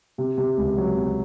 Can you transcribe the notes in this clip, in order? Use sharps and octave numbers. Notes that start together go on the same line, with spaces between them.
C3
C3
C#2
F#3
C3